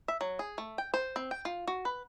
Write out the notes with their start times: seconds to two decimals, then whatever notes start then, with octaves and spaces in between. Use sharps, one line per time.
0.08 E5
0.21 F#3
0.39 G#4
0.58 A3
0.78 G5
0.94 C5
1.16 C4
1.31 G5
1.45 F4
1.68 F#4
1.85 B4